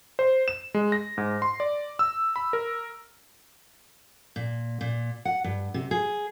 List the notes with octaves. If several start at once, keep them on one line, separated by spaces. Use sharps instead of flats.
C5
E7
G#3
A#6
G#2
C6
D5
E6
B5
A#4
A#2
A#2
F#5
G2
C3
G#4